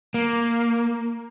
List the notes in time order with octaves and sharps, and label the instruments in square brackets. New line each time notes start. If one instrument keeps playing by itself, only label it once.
[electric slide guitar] A#3